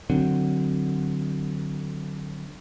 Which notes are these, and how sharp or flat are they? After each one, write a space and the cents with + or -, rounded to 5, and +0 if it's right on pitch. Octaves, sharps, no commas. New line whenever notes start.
D3 +10 F#3 +0 C4 +0